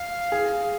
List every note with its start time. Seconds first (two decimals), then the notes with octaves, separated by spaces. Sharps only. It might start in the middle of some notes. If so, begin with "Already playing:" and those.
Already playing: F5
0.32 G#4